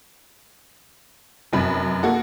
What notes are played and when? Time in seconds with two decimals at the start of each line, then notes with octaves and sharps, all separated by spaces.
1.53 F1 F#2 B5
2.03 A#3 F#4 A4